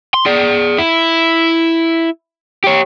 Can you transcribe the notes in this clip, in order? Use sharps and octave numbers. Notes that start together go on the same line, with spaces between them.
C6
G#4 D5
E4
G4 C#5